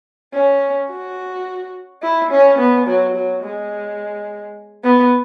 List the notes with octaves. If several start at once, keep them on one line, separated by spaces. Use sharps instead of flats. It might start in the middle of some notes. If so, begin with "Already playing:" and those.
C#4
F#4
E4
C#4
B3
F#3
F#3
G#3
B3